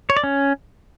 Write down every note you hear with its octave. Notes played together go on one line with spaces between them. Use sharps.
C#5
D5
C#4